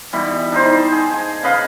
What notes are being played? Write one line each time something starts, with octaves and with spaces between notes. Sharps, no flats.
B2 E3 G3
D4 D#4 C5
G#4
G#5
C#3 B4 D#5 F5